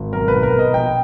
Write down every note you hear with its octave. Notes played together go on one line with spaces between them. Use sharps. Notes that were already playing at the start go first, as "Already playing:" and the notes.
Already playing: G#1
B1 A#4
B4
B2
A#4
B2
D#5
A#1 G5